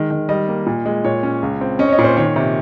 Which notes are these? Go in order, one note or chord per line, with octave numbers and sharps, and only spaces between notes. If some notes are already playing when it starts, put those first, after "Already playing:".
Already playing: D#3 G#3
D#3
G3 D#5
A#3
A#2
G#3
A#2 C#5
C#4
C#2
C4
C#4 D#5
C#5
D#5
A#2
C5
D#3 C#5
C3